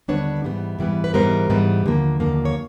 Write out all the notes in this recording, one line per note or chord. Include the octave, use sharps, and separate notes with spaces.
D#2 D3 G3 B3 D4 B4 C#5
G#2 E3 G3 B3
G#2 E3 G3 B3
B4
G#2 E3 G3 B3 A#4 C5
G#2 E3 G3 B3
D#2 D3 F3 A#3
D#2 D3 F3 A#3
C#5